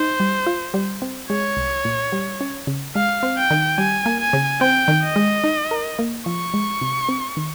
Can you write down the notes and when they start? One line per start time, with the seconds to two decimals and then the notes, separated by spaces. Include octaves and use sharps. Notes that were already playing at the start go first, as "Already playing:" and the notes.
Already playing: D#4 C5
0.20 G3
0.46 F4
0.74 G3
1.02 C4
1.30 G#3 C#5
1.57 C2
1.85 A#2
2.12 G3
2.41 C#4
2.67 C#3
2.95 G#3 F5
3.23 C4
3.37 G5
3.51 D#3
3.78 G3 G#5
4.06 A#3
4.19 G#5
4.33 C#3
4.61 C4 G5
4.88 D#3
5.03 D#5
5.16 G#3
5.44 D#4
5.71 A#4
5.99 A#3
6.26 F3 C#6
6.54 G#3
6.82 C3
7.09 C4
7.37 D#3